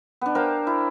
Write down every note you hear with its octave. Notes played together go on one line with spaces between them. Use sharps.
B3 D4
A#4 C5 F5 G5
E4